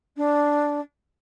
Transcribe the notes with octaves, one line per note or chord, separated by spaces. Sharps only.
D4